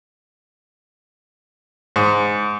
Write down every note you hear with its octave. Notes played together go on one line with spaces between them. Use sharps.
G#2